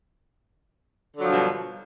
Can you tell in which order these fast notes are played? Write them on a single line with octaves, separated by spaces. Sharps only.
D3 F#3 F3 G2 B2